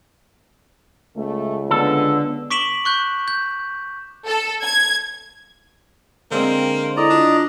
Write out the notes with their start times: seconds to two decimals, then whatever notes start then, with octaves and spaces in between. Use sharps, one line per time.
1.17 C#2 A3
1.71 D3 B3 A4
2.51 C#6 D6 B6 D7 E7 F#7
2.85 C#6 F#6 G6
3.28 G6
4.26 A4
4.63 G#6
6.31 D3 G#3 A#3 C4 C5
6.96 E4 A4 D5 D#5 A#5
7.10 D4 F4